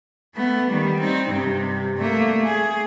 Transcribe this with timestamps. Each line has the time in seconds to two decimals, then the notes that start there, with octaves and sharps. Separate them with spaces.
0.35 A3 B3
0.68 D#3 G3
1.00 C4 D#4
1.28 G2 C3
1.98 A3 A#3
2.44 G#4